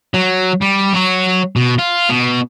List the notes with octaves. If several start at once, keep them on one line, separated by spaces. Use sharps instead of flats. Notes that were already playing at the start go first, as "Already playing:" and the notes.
F#3
G3
F#3 F#4
B2
F4
B2